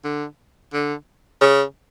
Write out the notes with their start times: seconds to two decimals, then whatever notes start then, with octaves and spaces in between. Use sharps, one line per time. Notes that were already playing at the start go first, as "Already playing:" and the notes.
0.04 D3
0.73 D3
1.41 C#3